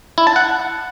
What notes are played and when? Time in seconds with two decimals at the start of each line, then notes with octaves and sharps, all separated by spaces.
0.18 E4
0.27 A5
0.36 F#5